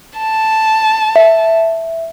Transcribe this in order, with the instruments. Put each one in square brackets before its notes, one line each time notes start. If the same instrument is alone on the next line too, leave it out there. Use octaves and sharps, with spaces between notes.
[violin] A5
[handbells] E5